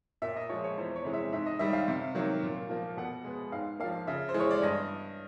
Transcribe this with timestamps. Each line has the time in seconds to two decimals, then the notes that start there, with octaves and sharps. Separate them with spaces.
0.22 A#2 E5
0.36 D#5
0.49 F3 G#3 C#5
0.64 C#5
0.78 E2 C5
0.96 C#5
1.05 C3 E3 G#3
1.13 E5
1.33 G#2 E5
1.46 D#5
1.59 D#3 G3 E5
1.73 F5
1.88 C3
2.15 D#3 F#3 A#3
2.43 A#2
2.69 F3 A#3
2.97 B2 F#5
3.24 G#3 B3
3.52 G#2 F5
3.80 F3 A#3 F5
4.07 C#3 E5
4.29 C5
4.34 E3 G#3
4.40 C#5
4.51 D5
4.62 G2 D#5